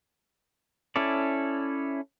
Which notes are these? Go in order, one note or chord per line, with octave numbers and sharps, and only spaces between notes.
C#4 E4 A4 D5